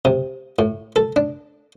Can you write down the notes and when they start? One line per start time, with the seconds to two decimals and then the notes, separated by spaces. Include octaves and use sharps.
0.05 C3
0.59 A2
0.96 A4
1.16 D4